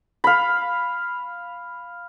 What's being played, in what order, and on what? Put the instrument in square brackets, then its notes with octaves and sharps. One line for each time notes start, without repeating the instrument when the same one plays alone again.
[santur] F5 B5